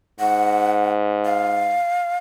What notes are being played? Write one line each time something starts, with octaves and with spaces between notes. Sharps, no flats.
G#2 F#5
F5